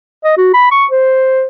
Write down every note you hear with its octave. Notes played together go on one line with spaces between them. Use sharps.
D#5
F#4
B5
C#6
C5